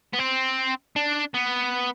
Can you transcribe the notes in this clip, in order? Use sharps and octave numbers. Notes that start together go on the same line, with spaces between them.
B3
C4
D4
B3